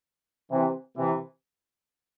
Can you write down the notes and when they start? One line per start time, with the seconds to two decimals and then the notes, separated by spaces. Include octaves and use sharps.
0.51 C3 E3
0.97 C3 E3